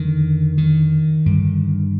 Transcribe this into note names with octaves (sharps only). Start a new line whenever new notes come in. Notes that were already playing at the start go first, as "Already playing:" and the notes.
Already playing: F2 D3 D#3
D#3
G2 D3